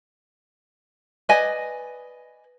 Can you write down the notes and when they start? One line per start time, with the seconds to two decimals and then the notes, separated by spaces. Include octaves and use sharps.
1.29 B4 D5 D#5 G#5